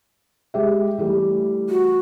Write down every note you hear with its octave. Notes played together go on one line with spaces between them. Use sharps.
G#3 G4 E5
E3 G3 A3
F#4